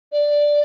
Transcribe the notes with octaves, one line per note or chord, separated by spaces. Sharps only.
D5